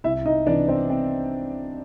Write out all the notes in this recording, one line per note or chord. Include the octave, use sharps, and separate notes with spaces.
C2 E4 E5
D#4 D#5
C3 E3 D4 D5
C4 C5
C4